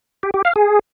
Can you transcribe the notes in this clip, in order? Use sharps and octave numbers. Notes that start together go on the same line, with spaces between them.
G4
G4
F5
G#4